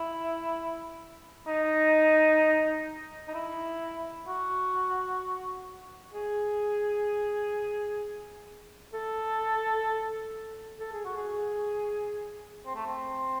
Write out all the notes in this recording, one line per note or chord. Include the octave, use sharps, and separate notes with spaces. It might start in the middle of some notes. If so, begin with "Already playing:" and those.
Already playing: E4
D#4
D#4
E4
F#4
G#4
A4
A4
G#4
F#4
G#4
C4
A3
C4